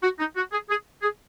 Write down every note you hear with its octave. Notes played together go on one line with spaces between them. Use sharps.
F#4
D#4
F#4
G#4
G#4
G#4